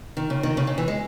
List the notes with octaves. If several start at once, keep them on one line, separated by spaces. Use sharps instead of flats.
D#3
C#3
D#3
C#3
C#3
E3
G#3